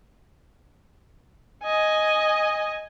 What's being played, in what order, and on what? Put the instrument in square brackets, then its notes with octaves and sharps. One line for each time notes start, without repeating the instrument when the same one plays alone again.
[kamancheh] D#5 G#5